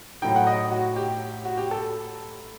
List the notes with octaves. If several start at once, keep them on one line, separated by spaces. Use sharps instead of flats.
A2 F#3 A3 D#4 G5
F#5
D#5
F#4
G4
F#4
G4
A4